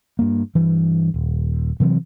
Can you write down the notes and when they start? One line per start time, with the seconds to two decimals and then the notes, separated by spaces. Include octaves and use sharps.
0.19 G2 A#3
0.55 G2 E3
1.14 D#1
1.80 C3 E3 F#3 C4